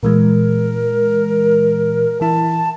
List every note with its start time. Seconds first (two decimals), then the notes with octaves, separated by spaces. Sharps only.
0.03 A#2 E3 G#3 A#4
2.21 E3 E4 A5